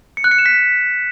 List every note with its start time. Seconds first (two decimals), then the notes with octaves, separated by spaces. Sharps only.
0.17 C#7
0.24 F#6
0.31 C#7
0.39 E7
0.46 B6